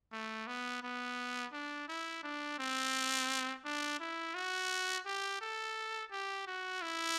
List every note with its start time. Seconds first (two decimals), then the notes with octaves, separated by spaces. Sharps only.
0.12 A3
0.47 B3
0.83 B3
1.53 D4
1.88 E4
2.23 D4
2.59 C4
3.65 D4
4.00 E4
4.35 F#4
5.06 G4
5.41 A4
6.11 G4
6.47 F#4
6.82 E4